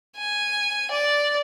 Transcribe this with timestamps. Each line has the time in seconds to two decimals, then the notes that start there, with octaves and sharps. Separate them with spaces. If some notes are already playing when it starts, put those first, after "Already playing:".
0.17 G#5
0.91 D5